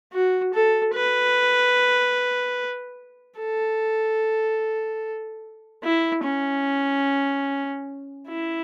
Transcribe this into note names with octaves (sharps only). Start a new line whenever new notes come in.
F#4
A4
B4
A4
E4
C#4
E4